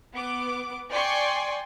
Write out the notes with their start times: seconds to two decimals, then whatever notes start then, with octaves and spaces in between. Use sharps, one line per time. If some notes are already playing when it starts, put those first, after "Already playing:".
0.14 B3 D6
0.91 D5 G5 G#5 C6 C#6